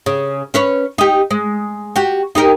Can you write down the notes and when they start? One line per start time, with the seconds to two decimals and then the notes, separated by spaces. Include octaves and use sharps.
0.06 C#3
0.54 C#4 B4 C#5
0.98 D#4 G4
1.31 G#3
1.96 F#4 G4
2.35 D#4 G4 A#4